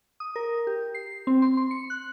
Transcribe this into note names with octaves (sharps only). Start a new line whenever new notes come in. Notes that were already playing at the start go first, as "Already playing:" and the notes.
D#6
A#4
G4
C7
C4
C6
C6
C#7
F#6